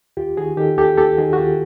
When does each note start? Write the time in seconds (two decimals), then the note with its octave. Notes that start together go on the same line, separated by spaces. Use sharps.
0.17 D#2 F4 G4
0.37 D#3 F#4 G#4
0.57 D#3 G4 A4
0.78 D#2 G4 A4
0.98 D#2 G4 A4
1.18 D#3 F#4 G#4
1.33 F#4
1.38 D#2 F4 G4